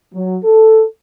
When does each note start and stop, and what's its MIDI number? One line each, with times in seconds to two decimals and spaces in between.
0.14 0.37 54
0.44 0.83 69